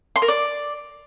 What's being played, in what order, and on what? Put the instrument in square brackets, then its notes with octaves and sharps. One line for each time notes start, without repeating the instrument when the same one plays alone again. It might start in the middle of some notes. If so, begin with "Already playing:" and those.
[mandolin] C6
A#4
D5